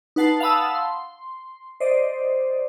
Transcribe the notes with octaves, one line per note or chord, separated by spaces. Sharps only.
D#4 B4 F#5 A5 C7
F5 F#5 A5 B5 D#6 E6
C6
C5 D5 D#5